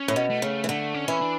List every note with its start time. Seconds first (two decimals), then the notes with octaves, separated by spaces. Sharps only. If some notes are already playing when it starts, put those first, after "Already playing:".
Already playing: C#4
0.08 A2
0.16 B2
0.30 A3
0.42 C#3
0.64 E3
0.69 D3 A3
0.94 C#4
1.08 E3
1.22 D4